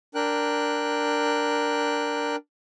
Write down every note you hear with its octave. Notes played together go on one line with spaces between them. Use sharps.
D4 A#4 G5 F#6